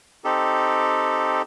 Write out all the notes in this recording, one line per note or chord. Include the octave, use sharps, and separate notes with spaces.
C4 D#4 G4 A4